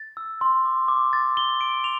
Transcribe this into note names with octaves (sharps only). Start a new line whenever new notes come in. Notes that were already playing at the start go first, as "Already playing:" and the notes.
Already playing: A6
E6
C6
D6
D6
A6
G7
D7
F7